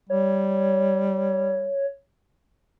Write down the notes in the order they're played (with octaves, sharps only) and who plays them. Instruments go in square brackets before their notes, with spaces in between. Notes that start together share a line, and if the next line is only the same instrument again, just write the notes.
[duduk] G3 [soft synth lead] C#5